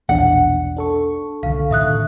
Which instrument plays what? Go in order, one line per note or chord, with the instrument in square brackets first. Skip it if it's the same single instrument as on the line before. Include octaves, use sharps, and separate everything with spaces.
[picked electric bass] E1 E2 A#3 [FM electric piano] A#1 D4 [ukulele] F#5
[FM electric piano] D4 A4 C#6
[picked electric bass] C2 D3 [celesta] F5
[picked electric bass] A2 D3 D#3 [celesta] E5 D#6 F#6